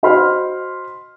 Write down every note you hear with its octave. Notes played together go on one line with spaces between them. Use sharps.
F#4 C5 D#5 B5 C6 F6